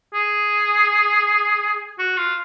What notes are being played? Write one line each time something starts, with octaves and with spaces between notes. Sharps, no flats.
G#4
F#4
F4